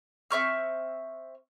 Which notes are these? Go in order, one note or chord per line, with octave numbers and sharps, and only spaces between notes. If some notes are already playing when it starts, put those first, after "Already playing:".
C4 E5 C#6 F6